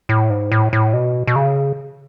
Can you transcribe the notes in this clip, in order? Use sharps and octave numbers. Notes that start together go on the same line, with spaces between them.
A2
G#2
A2
A2
B2
B2
C#3